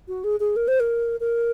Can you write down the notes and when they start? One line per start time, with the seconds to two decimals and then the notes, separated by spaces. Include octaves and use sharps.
0.08 F#4
0.24 G#4
0.40 G#4
0.56 A#4
0.68 C5
0.80 A#4
1.20 A#4